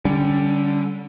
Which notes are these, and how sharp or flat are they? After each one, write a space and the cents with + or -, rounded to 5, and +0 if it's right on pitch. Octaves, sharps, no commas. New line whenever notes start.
D3 +0 G3 +0 C#4 +25